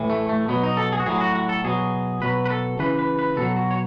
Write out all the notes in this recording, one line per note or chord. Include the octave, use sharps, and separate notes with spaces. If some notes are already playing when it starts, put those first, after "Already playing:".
Already playing: A2 E3
A3
A3
B2 F#3 B3
D#4
A4
G#4
F#4
A2 F#3 G#4
F#4
F#4
A4
B2 F#3 G#4
B2 F#3 B4
B4
A4
C#3 E3 B4
B4
B4
B2 F#3 A4
F#4
C#5